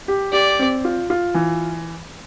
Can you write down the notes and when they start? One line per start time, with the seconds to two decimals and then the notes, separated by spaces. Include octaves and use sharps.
0.08 G4
0.33 G4 D5
0.59 C4
0.85 F4
1.10 F4
1.34 E3